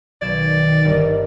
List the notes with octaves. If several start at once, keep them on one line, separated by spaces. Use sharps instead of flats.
B1 D#3 D5 G#6 E7
G1 A#4 D#5